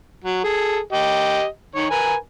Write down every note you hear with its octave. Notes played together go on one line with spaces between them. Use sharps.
F#3
G#4 A4
G4 D#5
D#3 C#5
A#4 B4 G#5